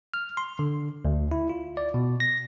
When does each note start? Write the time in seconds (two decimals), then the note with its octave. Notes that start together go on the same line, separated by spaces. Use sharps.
0.14 F6
0.37 C6
0.59 D3
1.05 D2
1.31 E4
1.49 F4
1.77 D5
1.94 B2
2.20 A#6